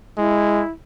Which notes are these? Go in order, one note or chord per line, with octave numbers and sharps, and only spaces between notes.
G#3 E4